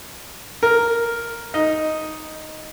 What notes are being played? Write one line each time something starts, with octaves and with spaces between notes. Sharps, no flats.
A#4
D#4